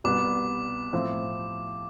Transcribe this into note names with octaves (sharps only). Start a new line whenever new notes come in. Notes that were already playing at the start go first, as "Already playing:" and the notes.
C2 B2 G3 B3 D6
A2 F3 C4 E4